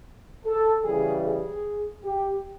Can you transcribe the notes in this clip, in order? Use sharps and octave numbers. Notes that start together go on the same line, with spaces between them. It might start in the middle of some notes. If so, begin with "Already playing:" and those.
A4
C#3 E3 G3 G#4
G#4
G4